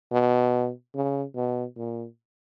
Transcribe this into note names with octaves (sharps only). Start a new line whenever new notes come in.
B2
C#3
B2
A#2